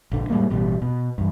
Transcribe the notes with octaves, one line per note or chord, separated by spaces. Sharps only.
A#1 D3
A2 G3 G#3 A#3
A1 B2 G3
B2
E2 G2